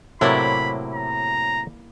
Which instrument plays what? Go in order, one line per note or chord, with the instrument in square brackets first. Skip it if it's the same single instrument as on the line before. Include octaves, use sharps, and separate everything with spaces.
[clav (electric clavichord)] A2 C3 F#3 [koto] A#3 E4 D5 [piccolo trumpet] B5
[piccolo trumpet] A#5